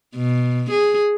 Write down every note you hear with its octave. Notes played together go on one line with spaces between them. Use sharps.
B2
G#4